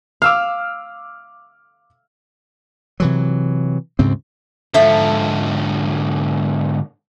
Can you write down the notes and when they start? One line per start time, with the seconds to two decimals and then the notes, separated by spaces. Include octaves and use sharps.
0.22 F5 D6 E6 F6
3.00 C3 E3 F#3
3.99 D2 G#2 C#3 C4
4.74 G#2 D3 F3 A4 E5